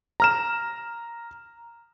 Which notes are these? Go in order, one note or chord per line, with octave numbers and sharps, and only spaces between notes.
A#5 F6 E7